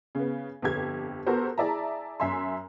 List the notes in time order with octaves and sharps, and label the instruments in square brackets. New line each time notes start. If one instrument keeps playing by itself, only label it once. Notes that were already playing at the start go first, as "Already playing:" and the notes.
[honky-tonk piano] C#3 B3
G1 F2 G4 G#6
B3 F#4 G4 A4 A#4 C5
E4 G#4 D5 E5 A5 A#5
F#2 E5 G#5 C6